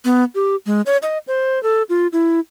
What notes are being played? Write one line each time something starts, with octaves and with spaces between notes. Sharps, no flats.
B3
G4
G#3
C#5
D#5
C5
A4
F4
E4